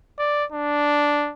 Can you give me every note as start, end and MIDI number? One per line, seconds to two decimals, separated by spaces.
0.18 0.44 74
0.52 1.32 62